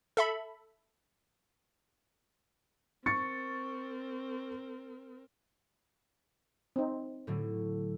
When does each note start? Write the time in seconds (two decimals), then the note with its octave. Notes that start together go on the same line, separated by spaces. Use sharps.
0.17 A4 E5 B5
3.06 C4 A#4 C#6 A6 C#7
6.76 C4 D#4
7.27 A2 D3 F#3